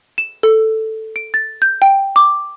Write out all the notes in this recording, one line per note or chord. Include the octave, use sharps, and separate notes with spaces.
E7
A4
D7
A6
G6
G5
D6